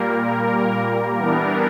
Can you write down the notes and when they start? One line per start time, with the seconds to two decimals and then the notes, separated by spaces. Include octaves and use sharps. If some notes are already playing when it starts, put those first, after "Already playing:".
Already playing: A#2 G3 A#3 A#4
0.20 A#4
1.16 E3 G3 B3 D4 A#4